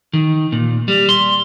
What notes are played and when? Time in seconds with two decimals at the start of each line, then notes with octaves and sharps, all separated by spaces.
0.13 D#3
0.52 A#2
0.88 G3
1.09 C6